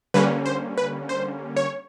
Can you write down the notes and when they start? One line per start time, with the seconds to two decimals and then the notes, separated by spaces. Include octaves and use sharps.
0.14 D3 G3 A#3 C#4 B4
0.46 C5
0.78 B4
1.09 C5
1.57 C#5